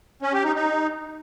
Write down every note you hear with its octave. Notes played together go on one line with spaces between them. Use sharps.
C#4
G4
D#4
D#4